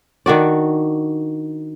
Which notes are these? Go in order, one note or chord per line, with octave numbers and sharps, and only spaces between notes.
D#3 D4 F#4 D5